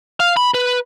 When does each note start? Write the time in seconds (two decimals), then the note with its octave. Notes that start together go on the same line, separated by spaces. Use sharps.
0.20 F5
0.37 B5
0.54 B4